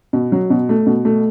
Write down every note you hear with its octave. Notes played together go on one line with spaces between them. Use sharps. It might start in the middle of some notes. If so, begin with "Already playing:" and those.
B2
F#3
B2
A3
B2
A3